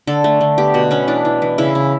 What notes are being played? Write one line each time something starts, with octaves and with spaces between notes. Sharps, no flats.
D3 A4
A3
D3
B3 G4
B2 F#4
B3 C#4
E3 D4
E3
E3
C#3 E4
C#3